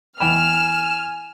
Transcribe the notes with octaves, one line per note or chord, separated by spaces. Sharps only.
E2 G5 G#5 B5 F6 E7